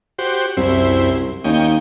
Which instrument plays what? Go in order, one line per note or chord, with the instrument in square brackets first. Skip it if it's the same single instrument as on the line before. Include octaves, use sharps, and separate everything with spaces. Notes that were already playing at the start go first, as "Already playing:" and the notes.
[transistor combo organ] F#4 G4 C5
[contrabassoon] C2 [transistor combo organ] F#2 E4 C5
[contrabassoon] D#2 [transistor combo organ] C#4 D#5 G5